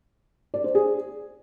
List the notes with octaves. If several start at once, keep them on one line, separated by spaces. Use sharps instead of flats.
D5
C5
G#4